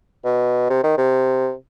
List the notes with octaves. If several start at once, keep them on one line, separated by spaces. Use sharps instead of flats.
B2
C3
D#3
C3